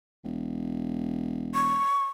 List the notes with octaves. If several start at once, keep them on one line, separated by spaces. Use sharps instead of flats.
E1
C#6